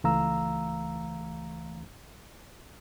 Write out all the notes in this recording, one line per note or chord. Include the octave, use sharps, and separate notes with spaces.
C#2 E3 A3 F5 A#5 E6